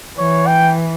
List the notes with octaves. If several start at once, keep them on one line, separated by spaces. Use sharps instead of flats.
E3 C#5
G5